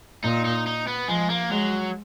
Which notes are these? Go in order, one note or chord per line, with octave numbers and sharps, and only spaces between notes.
A#2 D#4
D#4
D#4
B3
F3 G#3
A#3
F#3 G#3